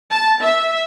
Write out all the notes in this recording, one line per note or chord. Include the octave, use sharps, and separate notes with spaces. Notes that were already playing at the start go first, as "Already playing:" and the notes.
A5
E5